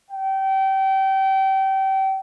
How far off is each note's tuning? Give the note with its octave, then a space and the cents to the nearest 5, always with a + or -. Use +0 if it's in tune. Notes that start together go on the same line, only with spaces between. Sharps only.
G5 -30